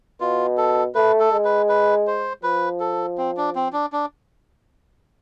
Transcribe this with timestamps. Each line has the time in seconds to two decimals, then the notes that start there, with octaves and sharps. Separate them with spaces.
0.20 B2 F4
0.58 A4
0.95 A3 B4
1.20 A4
1.32 G#3
1.45 B4
1.69 B4
2.07 C5
2.43 F3 B4
2.80 A4
3.18 C4
3.37 D4
3.55 C4
3.73 D4
3.93 D4